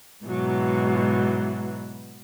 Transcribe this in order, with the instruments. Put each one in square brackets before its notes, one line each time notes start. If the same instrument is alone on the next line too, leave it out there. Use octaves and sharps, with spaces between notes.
[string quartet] G#2 B2 E3 F#3